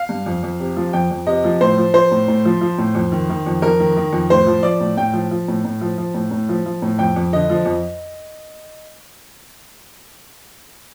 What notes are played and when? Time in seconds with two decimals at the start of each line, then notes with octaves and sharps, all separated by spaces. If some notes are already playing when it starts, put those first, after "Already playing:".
Already playing: F5
0.09 G2
0.26 F2
0.43 F2
0.60 C3
0.77 F3
0.93 F2 G5
1.11 F2
1.27 C3 D#5
1.44 F3
1.61 A2 C5
1.78 F3
1.94 F3 C5
2.11 A2
2.28 A2
2.45 F3
2.61 F3
2.78 A2
2.95 F2
3.12 D#3
3.30 D#3
3.46 F2
3.62 F2 A#4
3.80 D#3
3.97 D#3
4.13 F2
4.30 A2 C5
4.47 F3
4.63 F3 D5
4.80 A2
4.97 A2 G5
5.13 F3
5.31 F3
5.48 A2
5.65 A2
5.81 F3
5.98 F3
6.14 A2
6.31 A2
6.49 F3
6.66 F3
6.82 A2
6.99 F2 G5
7.16 F2
7.33 D3 D#5
7.50 F3
7.66 F2